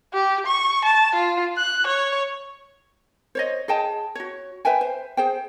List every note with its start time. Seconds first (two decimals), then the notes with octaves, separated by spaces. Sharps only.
0.14 G4
0.46 C#6
0.85 A5
1.15 F4
1.57 F#6
1.87 C#5
3.35 C5 C#5 D#5
3.68 G#4 D#5 G5 A5
4.15 F#4 C#5
4.65 B4 E5 G5 G#5
4.81 C5
5.17 G#4 C5 G5